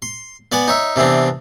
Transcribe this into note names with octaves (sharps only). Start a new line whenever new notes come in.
C6
B3 D5 F#5 G#5
D#4 C#5 E5
C3 E3 B3 C4 D4